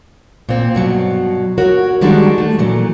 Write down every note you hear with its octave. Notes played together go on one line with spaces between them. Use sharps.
A#2 C4
G2 B2 F#3
F#4 A#4 C#5
D#3 G3 G#3 D4 F#4
A3
A#2 E3 F#3